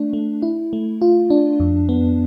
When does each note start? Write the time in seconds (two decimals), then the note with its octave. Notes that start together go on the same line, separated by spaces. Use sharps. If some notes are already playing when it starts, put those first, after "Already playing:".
Already playing: A3 D4
0.13 A3
0.42 E4
0.73 A3
1.02 F4
1.30 D4
1.60 F2
1.89 B3